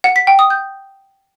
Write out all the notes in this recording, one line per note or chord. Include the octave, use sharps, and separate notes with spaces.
F#5
B6
G5
D#6
G6